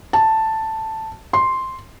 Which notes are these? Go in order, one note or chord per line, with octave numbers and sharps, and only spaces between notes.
A5
C6